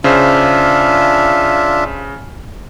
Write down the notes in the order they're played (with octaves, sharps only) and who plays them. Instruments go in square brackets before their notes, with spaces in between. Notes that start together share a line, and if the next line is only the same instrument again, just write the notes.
[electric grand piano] C#3 C5 [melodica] D4 F4 E5